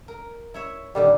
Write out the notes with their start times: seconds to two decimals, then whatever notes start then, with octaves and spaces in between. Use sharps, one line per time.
0.08 A#4
0.54 E4 C#5 E5
0.95 A#2 D3 D#3 G3